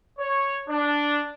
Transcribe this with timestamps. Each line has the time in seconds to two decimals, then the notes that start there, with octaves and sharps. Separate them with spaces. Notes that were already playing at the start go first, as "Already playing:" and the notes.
0.18 C#5
0.68 D4